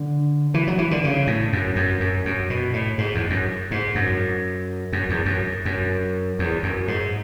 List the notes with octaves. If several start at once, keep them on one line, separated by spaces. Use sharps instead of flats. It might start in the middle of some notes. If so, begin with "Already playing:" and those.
Already playing: D3
E3
F#3
E3
D3
C#3
A2
F#2
F#2
F#2
F#2
B2
A2
G#2
E2
F#2
G#2
F#2
F#2
E2
F#2
F#2
E2
F#2
G#2